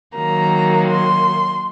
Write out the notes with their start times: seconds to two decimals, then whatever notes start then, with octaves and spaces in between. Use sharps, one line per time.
0.16 D#3 F#3 A#3 A#5
0.89 C6